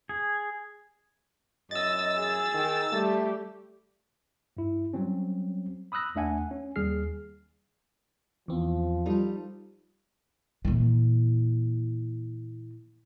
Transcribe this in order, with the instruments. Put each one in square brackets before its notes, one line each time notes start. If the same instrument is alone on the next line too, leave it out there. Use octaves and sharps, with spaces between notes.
[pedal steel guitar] G#4
[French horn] F#2 [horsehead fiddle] D#5 [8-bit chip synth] E6 A6
[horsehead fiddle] G#4
[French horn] D#3
[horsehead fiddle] G3 G4 [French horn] A3
[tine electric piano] G2 E4
F#3 G3 C4 C#4
B5 D#6 E6 F#6 A#6
D#2 A3 D4 E5 F#5 G#5
C#4
D#2 G3 G#4 F6 C7
[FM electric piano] E2 C4 [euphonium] F3
[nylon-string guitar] G3 D#4 [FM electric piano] F4 A4
[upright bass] A#2 E3